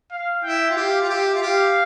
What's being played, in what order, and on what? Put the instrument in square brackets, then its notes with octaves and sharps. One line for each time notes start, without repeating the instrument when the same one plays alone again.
[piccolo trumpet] F5
[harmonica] E4 [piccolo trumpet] G5
[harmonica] F4
[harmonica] G4 [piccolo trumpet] F5
[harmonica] F4
[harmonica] G4 [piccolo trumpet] E5
[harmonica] F4
[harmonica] G4 [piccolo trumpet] F5